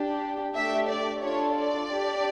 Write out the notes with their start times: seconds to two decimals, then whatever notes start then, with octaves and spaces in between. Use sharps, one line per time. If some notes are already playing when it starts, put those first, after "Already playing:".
Already playing: D4 G4
0.55 A3 D4 G4 E5
0.89 D5
1.22 D4 F4 A4 C#5
1.57 D5
1.91 D4 G4